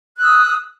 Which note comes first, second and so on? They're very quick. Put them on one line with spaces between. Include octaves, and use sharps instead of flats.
F#6 E6 D#6